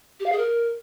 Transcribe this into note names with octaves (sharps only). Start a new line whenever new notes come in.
G4
F5
G#4
A#4